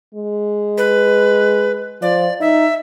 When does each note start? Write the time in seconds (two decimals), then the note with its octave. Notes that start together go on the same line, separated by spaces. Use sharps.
0.15 G#3
0.78 B4
2.02 F3 D5
2.40 D#4 E5